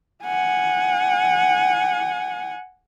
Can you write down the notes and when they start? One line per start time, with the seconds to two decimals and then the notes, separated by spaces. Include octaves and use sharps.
0.24 F#5 G#5